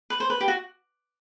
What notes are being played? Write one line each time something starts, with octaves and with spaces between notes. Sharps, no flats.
B4
C5
B4
G4
F#4